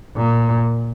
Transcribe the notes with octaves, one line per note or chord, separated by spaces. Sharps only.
A#2